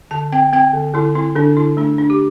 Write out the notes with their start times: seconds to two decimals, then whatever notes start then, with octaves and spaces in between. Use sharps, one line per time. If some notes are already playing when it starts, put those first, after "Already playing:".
0.11 D3 A5
0.32 C4 G5
0.53 C4 G5
0.73 D3
0.94 D3 E4
1.15 C4 E4
1.35 D3 D4
1.57 D3 E4
1.77 A3 D4
1.98 D4
2.10 G4